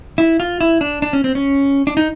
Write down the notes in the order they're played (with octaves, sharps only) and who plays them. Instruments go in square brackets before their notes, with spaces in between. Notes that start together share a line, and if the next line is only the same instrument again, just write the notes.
[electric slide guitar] E4
F4
E4
D4
D4
C#4
C4
C#4
D4
D#4